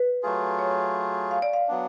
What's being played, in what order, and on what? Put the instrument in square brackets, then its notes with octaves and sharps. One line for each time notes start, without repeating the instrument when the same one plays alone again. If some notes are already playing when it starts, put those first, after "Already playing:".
Already playing: [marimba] B4
[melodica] F#3 A3 F4 G#4
[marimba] C#5
F5
D5
F5
[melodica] F#3 B3 D4